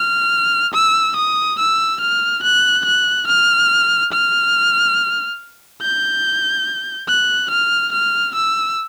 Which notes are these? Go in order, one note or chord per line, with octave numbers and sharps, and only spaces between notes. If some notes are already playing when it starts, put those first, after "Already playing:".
Already playing: F6
E6
D#6
E6
F6
F#6
F#6
F6
F6
G6
F#6
F6
F6
E6